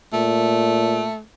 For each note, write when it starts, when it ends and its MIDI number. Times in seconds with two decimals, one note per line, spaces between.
0.13 1.09 46
0.13 1.21 57